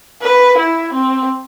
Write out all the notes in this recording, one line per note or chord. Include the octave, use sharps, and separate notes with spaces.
B4
E4
C4